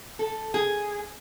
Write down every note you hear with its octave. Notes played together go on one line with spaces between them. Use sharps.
A4
G#4